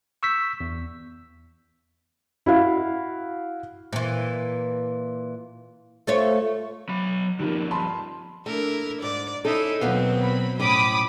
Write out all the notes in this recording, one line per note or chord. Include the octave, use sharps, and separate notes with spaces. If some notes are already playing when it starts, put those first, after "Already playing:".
C#6 E6 G6 B6
E2
E4 F#4 F5
A#2 E3
A3 F4 C#5
F#3 B5
G2 D#3 F3 G3 A#3
A5 B5 C6
A3 D4 E4 A#4
G#2 D5
C#4 D#4 E4 A4
D#2 B2 F#3 B3 C4 F5
B5
F2 A2 C#4 B5 D6 D#6